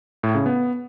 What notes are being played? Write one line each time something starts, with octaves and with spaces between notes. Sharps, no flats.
A2
C#3
B3